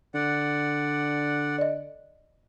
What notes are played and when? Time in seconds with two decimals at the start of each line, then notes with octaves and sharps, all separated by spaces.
0.14 D3 D5 F#5
1.58 D5 D#5